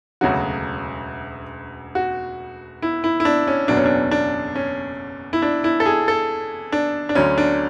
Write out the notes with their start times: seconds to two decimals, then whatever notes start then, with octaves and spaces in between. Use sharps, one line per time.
0.21 E1 D2 C#3 F#3 F#4
1.95 F#4
2.82 E4
3.04 E4
3.20 E4
3.25 D4
3.47 C#4
3.68 F#1 E2 B2 F#3 D4
3.77 C#4
3.86 D4
4.11 D4
4.55 C#4
5.33 E4
5.42 D4
5.64 E4
5.80 A4
5.86 G#4
6.08 A4
6.72 D4
7.09 D4
7.15 D2 D3 F#3 C#4
7.38 D4